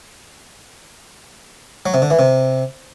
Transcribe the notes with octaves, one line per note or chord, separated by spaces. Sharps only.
F#3
C3
D3
E3
C3